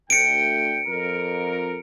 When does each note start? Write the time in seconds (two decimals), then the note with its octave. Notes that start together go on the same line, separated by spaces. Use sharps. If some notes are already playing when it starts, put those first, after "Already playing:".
0.10 D2 A3 G5 C#7 D7
0.88 F2 A#4